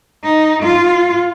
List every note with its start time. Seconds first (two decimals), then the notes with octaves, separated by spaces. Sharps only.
0.24 D#4
0.63 F4